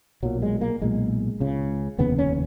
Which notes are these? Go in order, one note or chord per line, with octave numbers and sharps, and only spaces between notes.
B1 A#2 F#3
G#3
A#3
B1 A#2 G#3
C#2 C#3
F1 D#2 C#3 B3
C#4